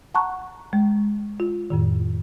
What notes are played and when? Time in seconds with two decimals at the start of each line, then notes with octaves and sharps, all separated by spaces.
0.14 F#5 A5 A#5 C#6 F#6
0.73 G#3
1.40 F4
1.70 F2 A2 D#3